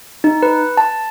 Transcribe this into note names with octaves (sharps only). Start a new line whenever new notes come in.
D#4
B4
A5